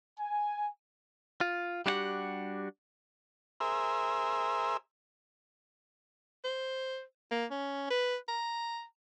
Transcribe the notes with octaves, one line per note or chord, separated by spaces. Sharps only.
G#5
F4
G3 D4 E4 F#4 G4 F#5
G#4 A#4 C5 E5
C5
A#3
C#4
B4
A#5